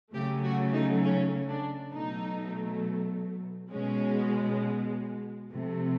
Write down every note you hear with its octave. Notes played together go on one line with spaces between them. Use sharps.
C#3 F#3 A3 G4
F#4
D#4
C#4
D4
B2 F#3 A3 D#4
B2 G#3 C#4
C3 F3 A3